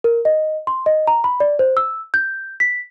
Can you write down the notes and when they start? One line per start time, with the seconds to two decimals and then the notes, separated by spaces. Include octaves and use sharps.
0.04 A#4
0.25 D#5
0.67 C6
0.86 D#5
1.07 A#5
1.24 B5
1.40 D5
1.59 C5
1.77 E6
2.14 G6
2.60 B6